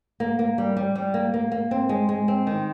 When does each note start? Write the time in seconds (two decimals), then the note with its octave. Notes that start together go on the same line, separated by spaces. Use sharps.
0.20 A#3
0.39 A#3
0.58 G3
0.77 G3
0.95 G3
1.14 A#3
1.34 A#3
1.52 A#3
1.71 C4
1.89 G#3
2.09 G#3
2.28 C4
2.47 D#3